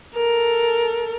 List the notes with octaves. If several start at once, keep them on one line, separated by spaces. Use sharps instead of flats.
A4 A#4